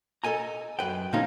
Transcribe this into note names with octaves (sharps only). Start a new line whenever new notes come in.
A4 D#5 G#5 A#5
F#2 B4 G5
A#2 C#3 F3 A3 C#4 D#4